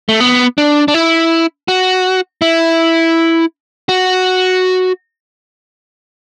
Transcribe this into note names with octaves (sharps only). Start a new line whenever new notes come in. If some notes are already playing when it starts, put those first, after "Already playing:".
A3
B3
D4
D4
E4
F#4
E4
F#4